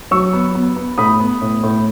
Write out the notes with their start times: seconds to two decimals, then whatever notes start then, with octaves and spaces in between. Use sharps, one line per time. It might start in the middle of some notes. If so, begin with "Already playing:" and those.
0.11 F#3 C#6 E6
0.33 B3
0.55 B3
0.76 B3
0.98 A2 B5 D#6
1.20 B3
1.41 A2
1.63 A2